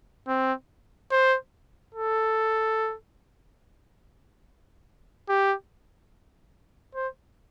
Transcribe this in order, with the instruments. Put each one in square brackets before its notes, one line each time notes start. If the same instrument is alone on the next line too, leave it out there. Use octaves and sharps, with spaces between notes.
[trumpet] C4
C5
A4
G4
C5